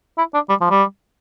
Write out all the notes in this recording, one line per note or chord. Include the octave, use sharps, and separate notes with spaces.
E4
D4
G3
F3
G3